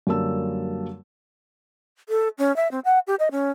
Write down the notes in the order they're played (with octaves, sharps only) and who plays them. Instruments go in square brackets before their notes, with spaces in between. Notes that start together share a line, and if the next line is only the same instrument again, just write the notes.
[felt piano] F#2 D3 G3 A#3 A5 E6
[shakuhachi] A4
C#4
E5
C4
F#5
G4
D#5
C#4